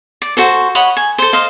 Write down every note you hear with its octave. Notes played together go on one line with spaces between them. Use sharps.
D5
F#4 A4 C5
C#5 D#5 F#5 B5
G#5
A4 C5
C5 D#5 F5